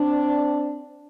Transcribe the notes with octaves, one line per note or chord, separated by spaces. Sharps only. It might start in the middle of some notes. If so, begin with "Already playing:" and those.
Already playing: C4 D4